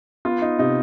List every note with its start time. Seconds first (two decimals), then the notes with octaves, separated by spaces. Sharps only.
0.25 B3 F4
0.42 D#4
0.59 C3 D#4